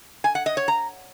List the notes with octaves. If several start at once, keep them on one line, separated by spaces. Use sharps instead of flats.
G#5
F#5
D#5
C#5
A#5